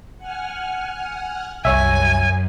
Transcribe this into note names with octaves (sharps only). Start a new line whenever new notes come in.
F#5 G#5 F6
C2 F#2 C#5 E5 G#5